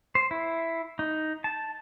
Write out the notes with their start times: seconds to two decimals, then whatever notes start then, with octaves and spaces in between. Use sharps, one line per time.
0.15 C5
0.31 E4
0.99 D#4
1.44 A5